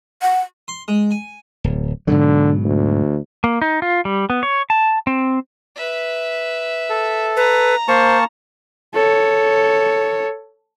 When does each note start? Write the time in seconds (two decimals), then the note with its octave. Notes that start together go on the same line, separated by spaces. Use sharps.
0.22 F#5
0.68 C6
0.88 G#3
1.11 G#5
1.64 D1
2.07 G#2 B2 D3 F#3
2.64 D2
3.44 A#3
3.62 D#4
3.82 F4
4.05 G3
4.30 B3
4.43 C#5
4.70 A5
5.07 C4
5.75 B4 E5
6.90 A4
7.37 B4 A#5
7.88 A#3 C5 A5 C#6
8.94 A4 C#5